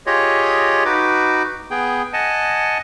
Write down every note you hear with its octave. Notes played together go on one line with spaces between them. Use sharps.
F4 G4 G#4 C#5 D#5
D#4 F#4 B4 D6
B3 G#4 G5
D#5 F#5 G#5 A5